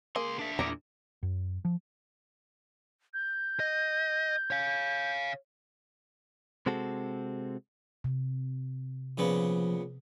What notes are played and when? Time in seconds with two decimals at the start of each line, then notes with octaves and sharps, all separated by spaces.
0.16 C#2 A#3 G#4 C6
0.39 D4 E5
0.59 E2 A#2 D5 A#5
1.23 F#2
1.65 F3
3.14 G6
3.60 D#5
4.51 C#5 F5
6.66 C3 G#3 C4 F#4 A4
8.04 C3
9.18 A#2 C#3 F3 B3